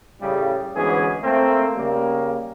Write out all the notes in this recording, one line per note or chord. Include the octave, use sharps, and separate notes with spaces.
A2 C#3 G3
D2 G#2 E3 B3 C#4 G#4
A3 A#3 C4
C#3 G3 A#3